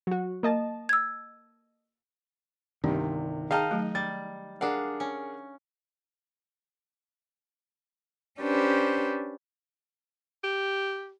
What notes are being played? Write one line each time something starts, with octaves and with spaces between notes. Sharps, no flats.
F#3 F#4
A#3 D#5 A5
E6 G#6
G1 C2 C3 D#3 D4
D#4 G#4 D#5 F5 G5 A5 A#5 F6
F#3 A3
G3 A6
D4 G#4 A#4 F5 F#5
C#4
C#4 D4 G4 B4 C5
G4